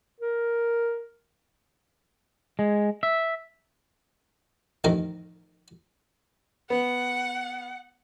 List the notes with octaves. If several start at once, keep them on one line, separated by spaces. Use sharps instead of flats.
A#4
G#3
E5
A1 F2 D#3 A#4
B3 F#5